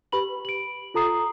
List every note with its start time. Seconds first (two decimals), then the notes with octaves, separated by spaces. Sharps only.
0.12 G4 B4 B5 F#7
0.45 D7 F#7
0.94 F4 A4 A#5 D#6 C7